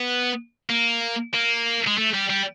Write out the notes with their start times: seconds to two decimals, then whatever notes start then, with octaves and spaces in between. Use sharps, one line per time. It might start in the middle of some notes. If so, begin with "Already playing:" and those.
Already playing: B3
0.70 A#3
1.34 A#3
1.87 G#3
1.98 A3
2.14 G3
2.30 G3